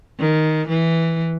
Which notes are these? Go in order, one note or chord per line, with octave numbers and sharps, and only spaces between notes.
D#3
E3